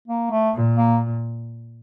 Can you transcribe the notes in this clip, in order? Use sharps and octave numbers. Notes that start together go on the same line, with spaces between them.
A#3
A3
A#2
A#3